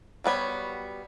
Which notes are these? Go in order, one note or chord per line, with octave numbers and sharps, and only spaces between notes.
F#3 G3 B3 C#5